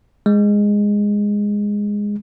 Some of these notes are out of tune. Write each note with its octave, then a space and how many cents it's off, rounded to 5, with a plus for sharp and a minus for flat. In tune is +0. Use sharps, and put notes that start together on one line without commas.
G#3 -10